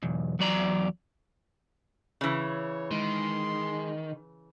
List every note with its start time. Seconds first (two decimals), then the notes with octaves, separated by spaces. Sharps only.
0.03 B1 E2
0.39 E2 F#3 D5 A#5
2.21 C#3 E3 C#5
2.91 D#3 G#3 C6